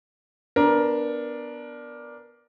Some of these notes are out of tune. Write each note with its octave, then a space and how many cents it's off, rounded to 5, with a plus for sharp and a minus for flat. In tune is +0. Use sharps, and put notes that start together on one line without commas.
B3 +0 D4 +0 A#4 +15